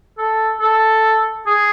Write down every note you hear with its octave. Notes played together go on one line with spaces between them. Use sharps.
A4
A4
G#4